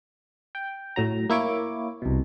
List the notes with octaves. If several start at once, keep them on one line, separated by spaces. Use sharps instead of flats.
G5
A2 F#3 A#5
A#3 E4 C#5 D6
C2 B2